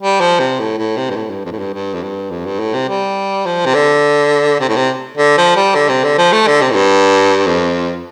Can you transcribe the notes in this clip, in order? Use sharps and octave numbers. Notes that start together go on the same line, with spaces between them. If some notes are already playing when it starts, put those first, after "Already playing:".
G3
F3
C3
A2
A2
C3
G2
A2
G2
F2
A2
G2
G2
F2
G2
F2
G2
A2
C3
G3
F3
C3
D3
C3
A2
C3
D3
F3
G3
D3
C3
D3
F3
A3
D3
C3
A2
G2
F2